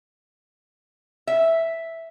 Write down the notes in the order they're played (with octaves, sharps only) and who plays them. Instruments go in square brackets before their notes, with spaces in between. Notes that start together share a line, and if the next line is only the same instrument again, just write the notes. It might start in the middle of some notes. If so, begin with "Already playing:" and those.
[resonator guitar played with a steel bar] E5